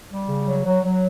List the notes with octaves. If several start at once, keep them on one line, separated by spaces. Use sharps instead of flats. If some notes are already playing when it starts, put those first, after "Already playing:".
G3
C#3
F#3
F#3
F#3